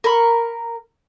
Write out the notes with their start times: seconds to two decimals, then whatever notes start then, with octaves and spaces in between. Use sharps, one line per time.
0.04 A#4 B5 C#6